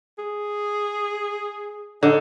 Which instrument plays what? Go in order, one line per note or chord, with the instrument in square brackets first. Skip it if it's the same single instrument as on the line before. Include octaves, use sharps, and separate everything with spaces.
[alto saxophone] G#4
[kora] D3 [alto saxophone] D#4